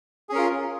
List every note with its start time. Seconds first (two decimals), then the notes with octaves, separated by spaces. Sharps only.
0.29 G#4
0.32 C#4
0.35 A#4
0.38 F4